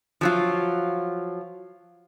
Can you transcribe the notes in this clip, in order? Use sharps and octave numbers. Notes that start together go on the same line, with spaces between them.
F3 F#3 F4